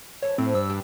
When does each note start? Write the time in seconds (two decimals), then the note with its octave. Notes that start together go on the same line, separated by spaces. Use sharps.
0.22 E3 A4 C#5
0.38 A2 F3 C4 D4
0.55 G2 E6
0.70 E3 D4 G4